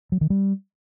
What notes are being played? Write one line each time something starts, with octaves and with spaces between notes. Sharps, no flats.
F#3
D#3
G3